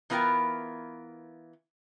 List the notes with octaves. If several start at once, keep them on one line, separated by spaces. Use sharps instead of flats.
E3 B3 F4 A#4 G5